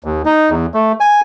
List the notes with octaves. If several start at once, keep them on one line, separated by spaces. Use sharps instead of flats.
D#2
D#4
E2
A3
G#5